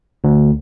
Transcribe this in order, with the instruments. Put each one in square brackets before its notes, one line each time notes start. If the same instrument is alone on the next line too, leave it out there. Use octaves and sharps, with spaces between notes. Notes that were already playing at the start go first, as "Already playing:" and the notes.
[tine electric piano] D2